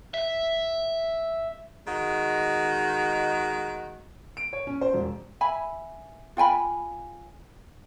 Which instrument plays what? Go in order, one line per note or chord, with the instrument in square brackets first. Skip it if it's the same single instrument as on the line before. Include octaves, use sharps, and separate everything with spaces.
[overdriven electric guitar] E5
[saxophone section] D#3 G#3 F#4
[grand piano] D7
C#5
C#4
C5
E1
[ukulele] E5 G#5 B5
F4 G5 G#5 B5